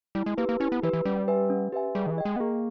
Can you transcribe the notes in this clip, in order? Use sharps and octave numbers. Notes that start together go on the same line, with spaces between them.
G3 E4
G#3
A#3 G4 B4
A#3
C#4 E4
B3
E3 G4 B4
E3
G3 C#4
G4 B4 E5 G#5
C#4
G4 B4 E5 G#5
G3 G#4
D#3
E3
D#5 G5
G#3
B3
A#3 G#4